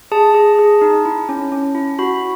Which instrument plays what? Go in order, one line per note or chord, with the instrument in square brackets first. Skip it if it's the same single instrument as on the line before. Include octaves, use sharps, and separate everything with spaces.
[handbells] G#4 A5
G#4
G#4
D#4
E4
C#4
C#4
E4
F#4 B5